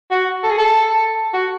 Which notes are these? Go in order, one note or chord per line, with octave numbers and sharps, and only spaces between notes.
F#4
A4
G#4
A4
F#4